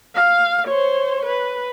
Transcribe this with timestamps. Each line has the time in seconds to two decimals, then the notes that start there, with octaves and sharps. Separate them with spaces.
0.15 F5
0.68 C5 C#5
1.26 B4